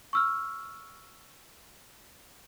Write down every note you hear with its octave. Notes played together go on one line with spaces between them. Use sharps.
C#6 E6 F6